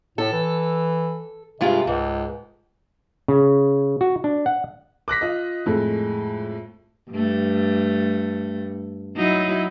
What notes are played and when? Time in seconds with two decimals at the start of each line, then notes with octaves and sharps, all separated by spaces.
0.18 A2 A4
0.33 E3
1.61 G2 C3 G#3 F4
1.87 C#2 G#2
3.28 C#3
4.01 F#4
4.24 D4
4.46 F#5
5.08 D6 F#6 A#6 B6
5.21 F4 D#5
5.66 F2 A2 G#3 A3
7.11 G2 A3
9.16 F#3 D#4 E4